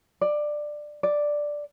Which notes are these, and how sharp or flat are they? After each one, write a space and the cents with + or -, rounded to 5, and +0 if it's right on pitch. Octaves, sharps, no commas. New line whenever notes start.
D5 +15
D5 +0